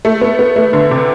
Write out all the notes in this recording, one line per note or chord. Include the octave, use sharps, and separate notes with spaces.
A3
B3
B3
A3
D3
C3